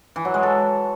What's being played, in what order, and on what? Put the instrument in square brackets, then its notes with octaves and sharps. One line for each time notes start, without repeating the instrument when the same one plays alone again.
[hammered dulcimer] E3
F#3
G#3
A4